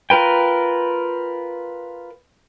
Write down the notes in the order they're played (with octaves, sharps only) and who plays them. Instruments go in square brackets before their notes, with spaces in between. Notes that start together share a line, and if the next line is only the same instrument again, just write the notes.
[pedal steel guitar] F4 A#4 B4 G5